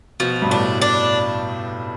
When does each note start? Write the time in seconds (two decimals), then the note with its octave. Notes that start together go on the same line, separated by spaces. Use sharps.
0.20 B2 F3
0.42 G2
0.50 A2 D4
0.82 D4